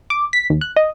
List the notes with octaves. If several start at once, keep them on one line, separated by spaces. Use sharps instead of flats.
D6
B6
D#2
F#6
D#5